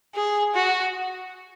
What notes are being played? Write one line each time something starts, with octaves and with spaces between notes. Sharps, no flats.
G#4
F#4